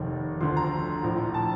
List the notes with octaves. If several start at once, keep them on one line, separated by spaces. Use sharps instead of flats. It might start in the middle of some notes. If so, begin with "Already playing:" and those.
Already playing: F1 D#2 D#3
D2 D3 F3 C6
A#5
A#1 A2 F3
A5